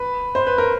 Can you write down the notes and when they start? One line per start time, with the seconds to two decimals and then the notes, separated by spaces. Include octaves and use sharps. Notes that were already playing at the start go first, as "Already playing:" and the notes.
Already playing: B4
0.35 C5
0.47 B4
0.58 A#4